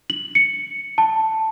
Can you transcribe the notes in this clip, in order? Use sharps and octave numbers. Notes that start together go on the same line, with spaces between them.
F#7
C#7
A5